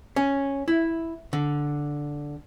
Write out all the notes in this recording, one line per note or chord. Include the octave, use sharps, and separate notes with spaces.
C#4
E4
D3